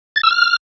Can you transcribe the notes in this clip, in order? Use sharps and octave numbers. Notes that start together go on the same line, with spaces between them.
A6
E6
F6